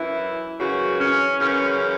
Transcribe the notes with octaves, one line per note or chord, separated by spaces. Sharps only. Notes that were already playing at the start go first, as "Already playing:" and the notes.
Already playing: F#2 E3 E4
F#2 C#3 E3 F#4
C#4
F#2 C#3 E3 C#4